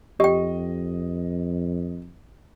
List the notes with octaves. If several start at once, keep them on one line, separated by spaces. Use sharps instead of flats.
F2 G4 D#5 G5